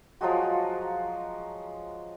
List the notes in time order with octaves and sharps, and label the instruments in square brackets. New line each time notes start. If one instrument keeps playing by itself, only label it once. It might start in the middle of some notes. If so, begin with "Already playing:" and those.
[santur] F3 F#3 G#3 F#4